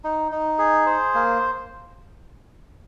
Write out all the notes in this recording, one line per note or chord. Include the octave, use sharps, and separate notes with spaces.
D#4
D#4
G#4
C5
A#3